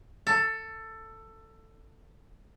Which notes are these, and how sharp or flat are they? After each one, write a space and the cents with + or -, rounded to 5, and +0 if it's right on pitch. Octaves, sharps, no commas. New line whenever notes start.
A4 +15